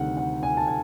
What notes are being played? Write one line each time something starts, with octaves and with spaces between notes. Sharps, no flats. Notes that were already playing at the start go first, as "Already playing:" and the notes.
Already playing: D2 C3 D#3 G3 F#5
F#5
G#5
A5
G#5